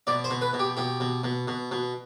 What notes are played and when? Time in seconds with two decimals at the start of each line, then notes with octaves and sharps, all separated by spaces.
0.07 B2 D5
0.24 C5
0.30 B2
0.42 B4
0.53 B2
0.59 G4
0.77 B2 G4
1.00 B2
1.24 B2
1.48 B2
1.71 B2